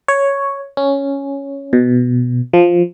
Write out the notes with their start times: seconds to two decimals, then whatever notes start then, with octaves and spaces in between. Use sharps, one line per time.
0.08 C#5
0.77 C#4
1.73 B2
2.53 F3